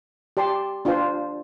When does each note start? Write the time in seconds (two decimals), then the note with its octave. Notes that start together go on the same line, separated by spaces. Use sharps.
0.37 G4 D5 A5 C6
0.85 D4 F4 C5